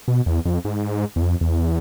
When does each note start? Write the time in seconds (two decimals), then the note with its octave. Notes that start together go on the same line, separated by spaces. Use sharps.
0.08 B2
0.26 E2
0.45 F2
0.65 G#2
1.16 E2
1.22 F2
1.41 E2